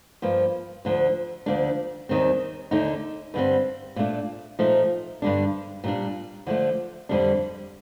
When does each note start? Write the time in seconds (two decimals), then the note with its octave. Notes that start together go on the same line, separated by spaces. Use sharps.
0.22 G2 F3 A#3
0.85 D2 D3 F3
1.46 D2 D3 F3 A#3 D4
2.09 D#2 D#3 G3 C4
2.71 D#2 D3 A3 D#4
3.34 G2 D3 G3 C4
3.96 A#2 A3 D4
4.59 A#2 F3 A3 D#4
5.22 G2 D3 G3 D4
5.84 A#2 G3 D4
6.47 D3 F3 A3
7.09 F2 D3 G3 D4